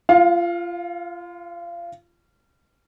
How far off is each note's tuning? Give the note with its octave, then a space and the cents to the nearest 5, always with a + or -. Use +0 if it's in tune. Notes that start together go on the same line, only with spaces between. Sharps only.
F4 -25 F5 +20